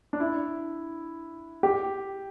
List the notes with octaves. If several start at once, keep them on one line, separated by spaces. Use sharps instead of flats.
D4
E4
G4